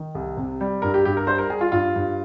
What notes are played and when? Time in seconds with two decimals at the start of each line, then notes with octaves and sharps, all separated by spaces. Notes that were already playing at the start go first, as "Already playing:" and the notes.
Already playing: D#3
0.15 C2
0.37 C3
0.61 G3
0.82 G2 A#4
0.94 G4
1.05 G2 G4
1.17 A#4
1.27 G3 C5
1.38 A#4
1.50 G3 G#4
1.61 F4
1.72 G2 F4
1.96 G2